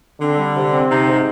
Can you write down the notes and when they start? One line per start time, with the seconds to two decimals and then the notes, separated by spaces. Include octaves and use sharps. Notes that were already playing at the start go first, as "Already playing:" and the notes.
0.20 D3 C4
0.37 G3
0.54 C3
0.72 C4
0.89 C3 D#4
1.07 G#2